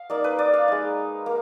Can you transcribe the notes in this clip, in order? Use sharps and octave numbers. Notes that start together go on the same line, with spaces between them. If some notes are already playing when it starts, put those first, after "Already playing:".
Already playing: F5
A#3 D#4 D5
B4
D5
F5
G#3 D#4
A#3